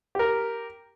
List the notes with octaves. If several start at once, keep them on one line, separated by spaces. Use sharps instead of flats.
G4 A#4